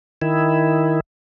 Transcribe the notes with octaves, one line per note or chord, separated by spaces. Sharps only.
D#3 E4